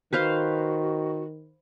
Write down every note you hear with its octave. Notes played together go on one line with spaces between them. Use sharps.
D#3 F#4 B4 C5 F5